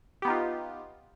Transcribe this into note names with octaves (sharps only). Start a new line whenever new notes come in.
B3 D#4 F4 G4